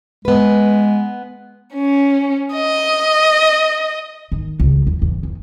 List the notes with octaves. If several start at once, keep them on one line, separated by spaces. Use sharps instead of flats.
G#3 B3 B4
C#4
D#5
D#3
C#2
E2
E2
E2